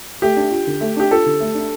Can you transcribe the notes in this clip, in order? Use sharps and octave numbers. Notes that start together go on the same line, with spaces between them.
A3 G4
D4
F4
D3
A3
D4 G4
F4 A4
D3
A3
D4